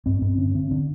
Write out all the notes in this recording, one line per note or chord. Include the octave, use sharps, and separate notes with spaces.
G2 C4
G2 C4
D3 C#4
D3 C4
D3 D4